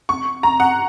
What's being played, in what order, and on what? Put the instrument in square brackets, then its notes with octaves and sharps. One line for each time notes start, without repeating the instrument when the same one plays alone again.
[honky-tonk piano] C#6
A#5
F#5